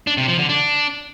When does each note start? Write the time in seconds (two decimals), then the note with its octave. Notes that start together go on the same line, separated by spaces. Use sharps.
0.07 D4
0.18 C3
0.28 F3
0.39 D3
0.49 D4